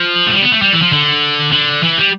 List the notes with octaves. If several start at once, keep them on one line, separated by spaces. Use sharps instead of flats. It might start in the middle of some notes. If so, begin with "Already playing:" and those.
Already playing: F3
A3
G3
B3
A3
G3
E3
F3
D3
D3
E3
G3